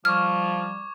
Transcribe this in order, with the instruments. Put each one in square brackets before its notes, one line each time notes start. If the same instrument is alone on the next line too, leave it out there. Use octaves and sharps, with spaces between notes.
[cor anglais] F3 [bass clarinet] G3 [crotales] C#6 D6 G#6 [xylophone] F6